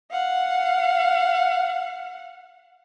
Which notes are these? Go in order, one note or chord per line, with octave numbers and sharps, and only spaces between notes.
F5 F#5